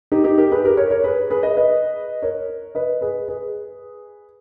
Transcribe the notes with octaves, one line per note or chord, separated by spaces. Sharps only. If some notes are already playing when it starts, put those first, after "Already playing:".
D#4 G4
D#4 G4
G4 A#4
G#4 B4
G4 A#4
A#4 C#5
A#4 C#5
G#4 B4
G#4 B4
B4 D#5
B4 D#5
A#4 C#5
B4 D#5
G#4 B4
G#4 B4